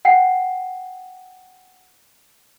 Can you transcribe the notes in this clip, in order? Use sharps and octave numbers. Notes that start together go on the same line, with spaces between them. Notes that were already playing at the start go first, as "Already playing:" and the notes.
F#5 G5 C7